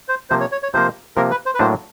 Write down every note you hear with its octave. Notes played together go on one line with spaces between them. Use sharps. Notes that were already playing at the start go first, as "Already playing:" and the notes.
C5
C3 F3 A#3 C5
C#5
C#5
C#5
C3 F3 A#3 C5
C3 F3 A#3 A#4
B4
C5
B4
A2 F#3 A#3 D4 C5